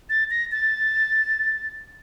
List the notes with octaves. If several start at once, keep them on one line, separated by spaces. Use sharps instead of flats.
A6
A#6
A6